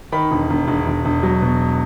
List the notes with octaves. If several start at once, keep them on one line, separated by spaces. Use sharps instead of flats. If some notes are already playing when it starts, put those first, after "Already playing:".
D#3 B5
E1
E1
E1
E1
E1
F#3
B2